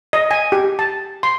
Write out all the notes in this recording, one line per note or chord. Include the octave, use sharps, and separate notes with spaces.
D#5
G#5
G4
A5
C6